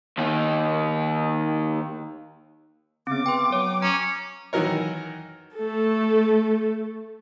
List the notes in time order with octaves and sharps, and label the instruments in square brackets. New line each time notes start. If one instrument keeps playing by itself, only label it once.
[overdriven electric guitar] D#2 D#3
[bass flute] C#3 [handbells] B3 C4 [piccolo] D6
[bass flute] B4 [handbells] G5 C6
[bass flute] F#3 [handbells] C#5
[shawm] C#4 [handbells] A#5
[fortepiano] D#3 E3 F#3 A#4 C#5
[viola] A3 A4